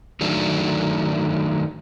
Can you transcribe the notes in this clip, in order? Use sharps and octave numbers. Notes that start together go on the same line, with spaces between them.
D#3 F#3 A3 D4